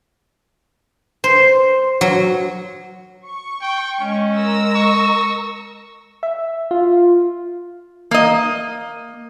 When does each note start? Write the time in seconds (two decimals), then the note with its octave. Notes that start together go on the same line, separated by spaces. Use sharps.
1.24 C5
2.01 F#3
3.26 C#6
3.62 G5
4.01 G#3 C#4
4.36 A#4 E6 A#6
4.75 C#6
6.23 E5
6.71 F4
8.11 A#3 D#5